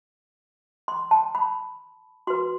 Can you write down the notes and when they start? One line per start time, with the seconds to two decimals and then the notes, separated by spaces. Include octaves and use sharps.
0.88 C6
1.11 A5
1.35 B5
2.27 F#4 C6
2.30 B4